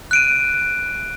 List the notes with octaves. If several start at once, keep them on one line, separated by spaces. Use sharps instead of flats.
F#6 D7 D#7